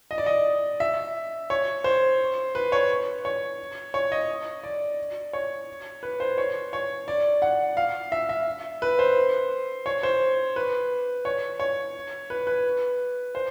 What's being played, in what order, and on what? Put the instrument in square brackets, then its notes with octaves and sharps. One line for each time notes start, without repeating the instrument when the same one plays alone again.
[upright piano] D#5
D5
D#5
E5
C#5
C5
B4
C#5
C#5
C#5
D#5
D5
C#5
B4
C5
C#5
C#5
D5
F#5
F5
E5
E5
B4
C5
C#5
C5
B4
C#5
C#5
B4
B4
C5